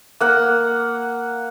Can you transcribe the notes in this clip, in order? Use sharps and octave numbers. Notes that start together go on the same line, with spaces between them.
A#3 F#5